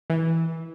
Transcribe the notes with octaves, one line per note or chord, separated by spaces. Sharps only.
E3